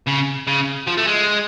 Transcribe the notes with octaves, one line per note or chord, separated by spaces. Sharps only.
C#3
C#3
F3
A3
G#3